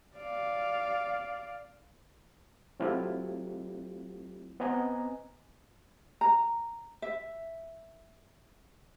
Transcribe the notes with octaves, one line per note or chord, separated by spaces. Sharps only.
D5 F5
F#3 A3 C4 E4 F4 G4
B3 C4 D#5 G#5 A#5
A#5
E5